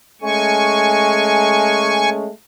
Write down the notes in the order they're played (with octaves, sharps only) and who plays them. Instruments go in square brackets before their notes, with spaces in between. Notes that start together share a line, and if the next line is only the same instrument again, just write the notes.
[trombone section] G#3 A3 C#4 [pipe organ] G#5 C#6